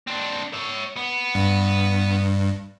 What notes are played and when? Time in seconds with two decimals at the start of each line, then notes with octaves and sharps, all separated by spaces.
0.07 C4 D4
0.53 C#5 E5
0.96 B3
1.35 G2